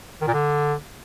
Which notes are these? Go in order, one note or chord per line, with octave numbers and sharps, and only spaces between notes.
D#3
A#2
D3